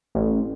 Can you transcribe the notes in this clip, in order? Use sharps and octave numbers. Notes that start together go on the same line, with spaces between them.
A1